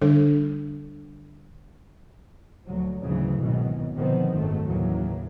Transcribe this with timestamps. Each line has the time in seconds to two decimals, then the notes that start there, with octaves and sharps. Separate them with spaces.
0.02 D3 G3 D4 A4
2.65 D2 F#3
3.01 D2 G#2 C#3 E3 F#3
3.40 C2 G#2 B2 D#3 E3 F#3
3.96 B2 D3 D#3 F3 B3 C4
4.34 F#1 G#2 F#3 A3
4.68 D#2 A2 C#3 E3 F#3 A#3